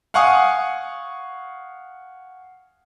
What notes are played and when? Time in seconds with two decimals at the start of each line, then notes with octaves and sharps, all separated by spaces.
0.14 F5 F#5 G#5 C#6 D#6